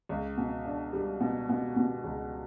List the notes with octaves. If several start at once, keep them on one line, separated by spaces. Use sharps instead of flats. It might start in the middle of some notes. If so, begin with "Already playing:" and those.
C#2
B2
D4
G3
B2
B2
B2
C#2